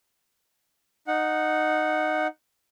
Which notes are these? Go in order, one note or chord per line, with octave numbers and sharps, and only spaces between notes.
D#4 F#5